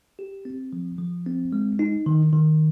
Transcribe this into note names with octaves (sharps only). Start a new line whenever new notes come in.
G4
C4
F3
F3
C4
G#3
D#4
D#3
D#3